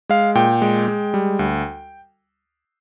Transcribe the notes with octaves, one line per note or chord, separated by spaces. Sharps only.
G#3 F5
A#2 G5
G#3
G#3
G3
D2